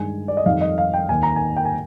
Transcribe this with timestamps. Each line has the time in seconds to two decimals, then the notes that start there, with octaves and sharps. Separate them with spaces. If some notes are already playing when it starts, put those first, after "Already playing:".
Already playing: G2 D#3 G#3 G#5
0.28 D5
0.37 D#5
0.46 F2 D#3 G3 F5
0.61 D#5
0.78 F5
0.94 G5
1.09 D#2 D#3 A#3 G#5
1.23 A#5
1.36 G#5
1.56 G5
1.65 G#5